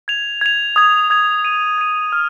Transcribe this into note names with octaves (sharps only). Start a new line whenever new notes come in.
G#6 F7
G#6 F7
D#6 G#6 F7
D#6 G#6 F7
G#6 D#7
G#6 D#7
F6